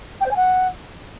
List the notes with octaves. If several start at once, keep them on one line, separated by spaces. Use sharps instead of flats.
G5
C5
G#5
F#5